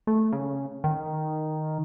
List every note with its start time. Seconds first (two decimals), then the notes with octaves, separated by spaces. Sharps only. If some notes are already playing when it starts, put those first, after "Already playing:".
0.07 A3
0.32 C#3
0.84 D#3